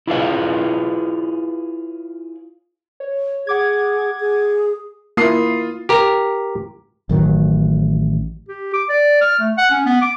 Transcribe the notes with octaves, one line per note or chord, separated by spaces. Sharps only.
E4 F4 G#4 B4 C#5 F5
C#5
G#4 F#5 D6 G#6
G#4
A#3 E4 F4 D#6 C7
G4 A#4
A1 D#3 F#3
G4
D6
D5
F6
A3
F#5
C#4
B3
D6